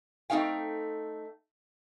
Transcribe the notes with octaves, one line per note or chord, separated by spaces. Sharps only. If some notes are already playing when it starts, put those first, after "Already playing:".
A3 C4 D#4 F5 G5